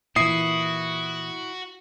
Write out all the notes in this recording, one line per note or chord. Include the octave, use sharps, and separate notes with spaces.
A#2 E3 E4 F#4 D#6 C7